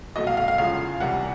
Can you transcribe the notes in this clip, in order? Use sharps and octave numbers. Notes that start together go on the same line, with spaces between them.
C2 B2 F#3 A3 D#5
F5
F5
F5
E2 C#3 F3 G#3 F5
C2 C3 E3 G3 F#5